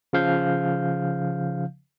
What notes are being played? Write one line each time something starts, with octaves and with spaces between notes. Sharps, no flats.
C#3 F3 F5 G6